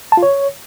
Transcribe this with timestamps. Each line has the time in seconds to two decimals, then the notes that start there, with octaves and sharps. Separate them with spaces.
0.12 A5
0.17 F4
0.23 C#5